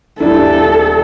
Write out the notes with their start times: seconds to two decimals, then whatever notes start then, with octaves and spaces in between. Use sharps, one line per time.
0.20 D#1 D4 E4 A4